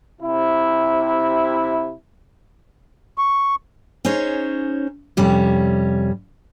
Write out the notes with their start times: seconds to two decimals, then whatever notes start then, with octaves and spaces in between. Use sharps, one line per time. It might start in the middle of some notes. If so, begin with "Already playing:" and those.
0.22 C3 E4
3.18 C#6
4.05 C#4 D#4 G#4 C5 C#5
5.17 F2 C3 G3 C#4